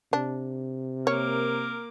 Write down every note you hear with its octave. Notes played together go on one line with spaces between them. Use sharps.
C3 D4
A#3 A#4 C#5 D6